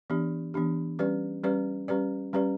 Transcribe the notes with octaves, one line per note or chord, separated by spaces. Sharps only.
E3 B3 D4 G4
E3 B3 D4 G4
G3 C#4 G4 B4 D5
G3 C#4 G4 B4 D5
G3 C#4 G4 B4 D5
G3 C#4 G4 B4 D5